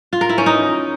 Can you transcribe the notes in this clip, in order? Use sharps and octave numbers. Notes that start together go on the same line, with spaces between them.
F4
A#4
E4
C#4
D#4